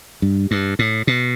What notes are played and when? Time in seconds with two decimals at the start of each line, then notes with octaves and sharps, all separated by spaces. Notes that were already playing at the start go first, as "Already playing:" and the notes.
0.22 G2
0.51 G2
0.79 A2
1.07 B2